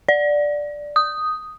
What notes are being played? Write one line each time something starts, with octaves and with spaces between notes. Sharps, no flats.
D5
D#6